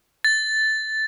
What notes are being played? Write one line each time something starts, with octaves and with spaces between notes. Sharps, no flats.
A6